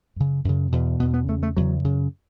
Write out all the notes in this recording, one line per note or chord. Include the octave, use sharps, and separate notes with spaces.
F#2 C#3
F#2 C#3
E2 B2
E2 B2 B3
B3
E2 C#3 A3
A3
E2 C#3 F#3
F#2 C#3